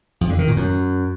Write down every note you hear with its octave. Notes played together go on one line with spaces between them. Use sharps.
F2
D3
D#3
A#2
F#2